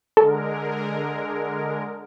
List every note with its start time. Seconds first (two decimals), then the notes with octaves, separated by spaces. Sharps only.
0.17 D3 G#3 A4 A#4